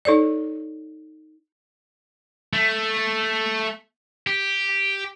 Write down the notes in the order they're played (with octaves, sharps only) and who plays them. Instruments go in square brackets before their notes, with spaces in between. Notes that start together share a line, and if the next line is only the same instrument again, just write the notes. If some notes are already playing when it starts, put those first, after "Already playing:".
[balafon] D#4 A4 C#5 D5
[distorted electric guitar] A3
G4